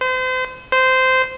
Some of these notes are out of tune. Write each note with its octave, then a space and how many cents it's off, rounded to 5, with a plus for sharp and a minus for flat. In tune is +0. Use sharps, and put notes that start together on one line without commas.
C5 -35
C5 -15